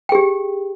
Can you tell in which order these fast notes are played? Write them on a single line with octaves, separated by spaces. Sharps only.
G5 G#4 G4